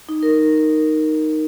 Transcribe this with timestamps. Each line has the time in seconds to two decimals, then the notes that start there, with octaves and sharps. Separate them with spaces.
0.09 D#4
0.23 A#4